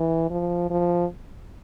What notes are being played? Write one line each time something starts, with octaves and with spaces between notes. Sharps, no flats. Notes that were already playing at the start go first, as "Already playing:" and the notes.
Already playing: E3
F3
F3